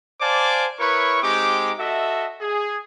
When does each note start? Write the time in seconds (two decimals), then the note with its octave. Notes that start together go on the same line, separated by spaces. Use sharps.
0.21 C5 D5 F5 G#5 A5 D6
0.79 E4 A#4 B4 C#5 C#6
1.23 G#3 C4 D#4 G4 D6
1.79 F#4 A4 D#5 E5
2.41 G#4